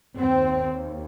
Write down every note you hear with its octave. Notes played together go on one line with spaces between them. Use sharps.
D#2 C4